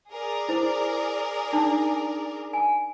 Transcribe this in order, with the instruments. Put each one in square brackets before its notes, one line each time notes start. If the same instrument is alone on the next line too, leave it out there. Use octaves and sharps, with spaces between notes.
[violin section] G#4 A#4 D5
[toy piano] E4 C5
D4 D#4
G#5